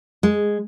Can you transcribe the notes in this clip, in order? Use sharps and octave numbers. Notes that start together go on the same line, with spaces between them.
G#3